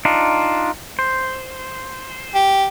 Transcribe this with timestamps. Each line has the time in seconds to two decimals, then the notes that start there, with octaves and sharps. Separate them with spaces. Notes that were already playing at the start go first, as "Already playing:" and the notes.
0.05 D4 D#4 F4
0.99 C5
2.35 G4